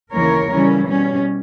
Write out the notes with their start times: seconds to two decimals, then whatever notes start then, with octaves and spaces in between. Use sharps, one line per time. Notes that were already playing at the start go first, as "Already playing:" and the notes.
0.12 D#2 C#3 E3 A#3 A#4 C#5
0.50 C#3 E3 G3 C#4
0.87 B2 G3 C#4